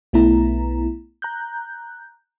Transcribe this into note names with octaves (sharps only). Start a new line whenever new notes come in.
B1 A3 B3 E4 A#5
A#5 F#6 G6